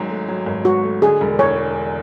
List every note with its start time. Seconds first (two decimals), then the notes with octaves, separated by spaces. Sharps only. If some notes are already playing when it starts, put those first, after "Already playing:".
Already playing: G#1 G#2 F#3
0.09 A3
0.28 F#3
0.46 G#1
0.65 G#2 F#4
0.83 A3
1.02 D3 G#4
1.21 E1
1.39 E2 C#5